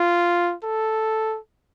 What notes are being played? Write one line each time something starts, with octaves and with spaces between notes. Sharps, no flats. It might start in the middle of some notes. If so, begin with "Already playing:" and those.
Already playing: F4
A4